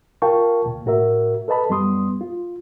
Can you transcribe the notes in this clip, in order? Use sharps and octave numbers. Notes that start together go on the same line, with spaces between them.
F4 A#4 F5 G5 A5 C#6
D2 A#2
A2 F#4 A#4 E5
A4 B4 D#5 A5 B5
F#2 G3 B3 C6 D#6
F4